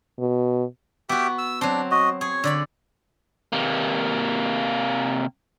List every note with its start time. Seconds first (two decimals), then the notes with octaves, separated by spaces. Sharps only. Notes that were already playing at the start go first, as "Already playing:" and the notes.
0.18 B2
1.09 B3 F#4 G4 E5 G5
1.38 E6
1.61 F#3 C4 D4
1.91 F#4 D#5
2.21 G#4 C#5
2.44 D3 D5 B5
3.53 C3 A#3